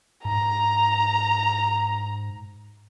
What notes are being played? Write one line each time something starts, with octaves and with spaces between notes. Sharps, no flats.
G#2 A#5